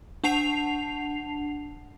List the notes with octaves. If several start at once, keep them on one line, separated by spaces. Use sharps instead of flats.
D4 F#5 A5 C7 F7